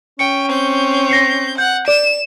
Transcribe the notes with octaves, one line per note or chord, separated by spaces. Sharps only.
C#4 G5 C#7
C4 G6
A#6 C7 C#7
F#5 G6
D5 E7